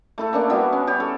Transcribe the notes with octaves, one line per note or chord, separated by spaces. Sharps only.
A3 E4 A4
A#3 C#4 D4
G3 B3 E4 F#4
C#4
G4 C#5
A4